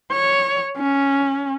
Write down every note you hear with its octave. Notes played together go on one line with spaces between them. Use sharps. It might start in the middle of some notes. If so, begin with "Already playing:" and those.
C#5
C#4